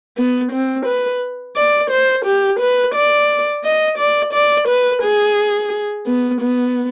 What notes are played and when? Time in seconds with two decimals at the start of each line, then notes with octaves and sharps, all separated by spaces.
0.17 B3
0.52 C4
0.86 B4
1.56 D5
1.91 C5
2.26 G4
2.60 B4
2.95 D5
3.64 D#5
3.98 D5
4.33 D5
4.68 B4
5.03 G#4
6.07 B3
6.41 B3